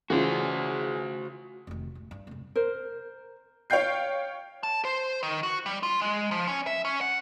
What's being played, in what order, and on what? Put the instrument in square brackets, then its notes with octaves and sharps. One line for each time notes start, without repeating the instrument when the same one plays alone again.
[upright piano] C#3 F4 [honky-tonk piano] E3 G#4 [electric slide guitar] F#4 C5
[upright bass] F1 D#3
A2
G2
F1 F#2
[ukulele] A#4 C5
[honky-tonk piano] C#5 F5 G5 G6 C7
[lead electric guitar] A5
C5
D#3
F#4
G3
F4
G#3
F3
C#4
E5
C#4
F#5